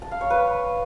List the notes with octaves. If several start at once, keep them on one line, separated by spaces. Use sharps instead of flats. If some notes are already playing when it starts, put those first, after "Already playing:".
A5
F5
C#5
B4